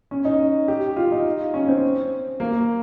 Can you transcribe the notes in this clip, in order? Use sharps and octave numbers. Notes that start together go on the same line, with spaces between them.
C#4
D#4
G4
F4
D#4
C#4
C4
A#3